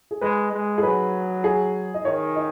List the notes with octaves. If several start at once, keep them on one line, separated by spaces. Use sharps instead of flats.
G#4
G#3 B4
G#3
G#4
F#3 B4
G#4
D#5
D#3 C#5
D#5